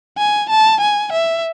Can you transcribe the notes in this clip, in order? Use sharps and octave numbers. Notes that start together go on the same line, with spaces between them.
G#5
A5
G#5
E5